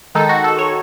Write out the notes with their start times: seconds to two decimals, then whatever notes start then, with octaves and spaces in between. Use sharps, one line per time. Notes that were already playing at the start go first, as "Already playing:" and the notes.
0.15 D#3 G#3 D#4 A4
0.29 F#4
0.44 A4
0.59 C#5